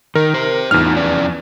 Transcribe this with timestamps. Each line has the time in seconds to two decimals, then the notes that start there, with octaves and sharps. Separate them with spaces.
0.15 D#3 A#4
0.34 G4 C5
0.71 E2 A2 D#4 F4 F6
0.96 F2 C#4 D5